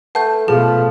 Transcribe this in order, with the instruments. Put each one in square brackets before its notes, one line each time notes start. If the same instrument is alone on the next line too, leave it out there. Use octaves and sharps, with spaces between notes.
[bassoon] A3 [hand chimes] B4 A5 [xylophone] F#5 G6
[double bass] B2 A3 [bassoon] F3 [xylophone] G#4 [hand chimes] B4 F5